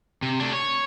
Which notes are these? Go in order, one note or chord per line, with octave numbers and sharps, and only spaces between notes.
C3
A3 D4
C#5